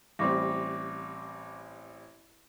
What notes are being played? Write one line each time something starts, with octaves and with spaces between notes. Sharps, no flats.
A1 G3 C4 C#6 D6 A#6